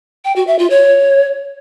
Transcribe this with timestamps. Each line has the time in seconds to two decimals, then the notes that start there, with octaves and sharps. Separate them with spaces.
0.25 G5
0.36 F#4
0.47 E5
0.59 F4
0.70 C#5